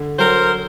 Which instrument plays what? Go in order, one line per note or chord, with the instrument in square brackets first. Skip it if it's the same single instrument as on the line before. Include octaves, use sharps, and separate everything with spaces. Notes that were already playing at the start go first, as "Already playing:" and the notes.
Already playing: [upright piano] D3
[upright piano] F#3 [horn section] A#4 C5